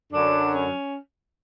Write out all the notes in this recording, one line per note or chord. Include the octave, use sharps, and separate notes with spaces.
F#2 D3 F#3 D4
C#4